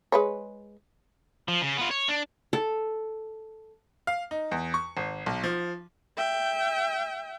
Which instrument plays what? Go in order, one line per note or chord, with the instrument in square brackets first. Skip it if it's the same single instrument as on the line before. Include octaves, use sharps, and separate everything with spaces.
[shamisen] G#3 B4 C#5
[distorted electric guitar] F3
C#3
B3 F4
C#5
D4
[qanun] A4
[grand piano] F5
D#4
E2
C#6
G#1
B1
F3
[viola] E5 G5